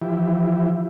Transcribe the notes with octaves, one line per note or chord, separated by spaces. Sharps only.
E3 F3 E4 G4